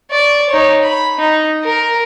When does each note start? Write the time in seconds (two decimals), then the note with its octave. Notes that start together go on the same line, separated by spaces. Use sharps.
0.11 D5 C#6
0.50 D#4 C#5
0.82 B5
1.19 D#4
1.64 A#4